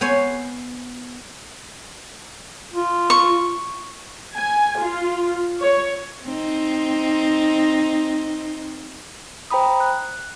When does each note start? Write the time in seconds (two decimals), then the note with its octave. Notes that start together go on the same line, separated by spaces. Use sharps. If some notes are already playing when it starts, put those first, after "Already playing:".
0.01 B3 C5 C#5 G#5
2.73 F4
3.10 C#6
4.35 G#5
4.79 F4
5.61 C#5
6.25 C4 D#4
9.50 C5 G5 A#5 B5 D#6
9.80 F#6